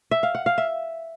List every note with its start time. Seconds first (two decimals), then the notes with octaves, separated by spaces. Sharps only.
0.11 E5
0.23 F5
0.35 F#5
0.46 F5
0.58 E5